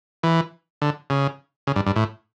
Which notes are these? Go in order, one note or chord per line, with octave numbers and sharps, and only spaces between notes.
E3
D3
C#3
C#3
G2
G2
A2